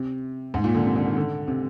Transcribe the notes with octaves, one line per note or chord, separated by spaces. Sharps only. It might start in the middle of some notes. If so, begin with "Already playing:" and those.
Already playing: C3
G#2
A#2
D3
C3
D3
D#3
D3
C3